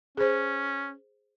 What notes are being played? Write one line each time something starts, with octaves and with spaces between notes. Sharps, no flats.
C#4 G#4 C5